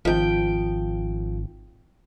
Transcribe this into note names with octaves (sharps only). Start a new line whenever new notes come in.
G#1 F3 G5